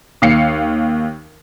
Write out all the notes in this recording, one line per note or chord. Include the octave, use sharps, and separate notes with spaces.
D#2 F5 C7 C#7